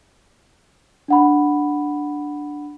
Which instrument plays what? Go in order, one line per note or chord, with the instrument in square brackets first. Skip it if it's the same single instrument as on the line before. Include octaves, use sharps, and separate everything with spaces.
[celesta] D4 F#5 B5